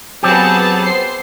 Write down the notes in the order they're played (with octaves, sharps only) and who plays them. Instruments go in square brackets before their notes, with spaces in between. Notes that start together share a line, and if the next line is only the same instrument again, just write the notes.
[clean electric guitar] F#3 C4 G4 [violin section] B3 G#4 A5
[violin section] C5 C7